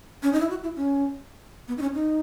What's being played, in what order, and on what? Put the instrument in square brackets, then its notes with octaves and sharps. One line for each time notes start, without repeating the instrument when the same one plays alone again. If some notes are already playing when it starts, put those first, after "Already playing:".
[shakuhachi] C#4
D#4
E4
F#4
E4
C#4
B3
D#4
C#4
D#4